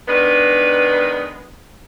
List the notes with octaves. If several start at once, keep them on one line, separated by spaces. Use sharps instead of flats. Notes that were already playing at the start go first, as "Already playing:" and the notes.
D#3 G#3 B3 D4 B4